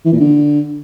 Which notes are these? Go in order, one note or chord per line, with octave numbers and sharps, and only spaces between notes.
E3
A#2
D3